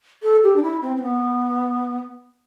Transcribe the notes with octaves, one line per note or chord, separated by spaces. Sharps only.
A4
G4
D4
E4
C4
C4
B3